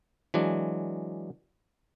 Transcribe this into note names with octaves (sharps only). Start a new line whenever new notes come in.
E3 F#3 G#3 D4